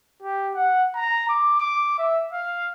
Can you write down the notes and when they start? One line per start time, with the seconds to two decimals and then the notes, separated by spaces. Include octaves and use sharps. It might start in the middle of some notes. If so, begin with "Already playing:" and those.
0.23 G4
0.55 F#5
0.96 A#5
1.29 D6
1.60 D6
1.99 E5
2.33 F5